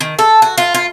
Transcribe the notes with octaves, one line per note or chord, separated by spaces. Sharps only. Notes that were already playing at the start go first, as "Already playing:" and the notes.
D#3
A4
F#4
F4
F4